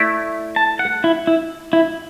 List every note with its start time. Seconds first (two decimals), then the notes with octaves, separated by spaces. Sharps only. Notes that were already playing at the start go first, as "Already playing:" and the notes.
Already playing: A3 E4 D5
0.56 A5
0.79 F#5
1.04 E4
1.27 E4
1.73 E4